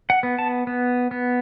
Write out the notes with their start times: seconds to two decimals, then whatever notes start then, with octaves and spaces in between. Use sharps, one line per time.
0.10 F#5
0.23 B3
0.39 A5
0.67 B3
1.11 B3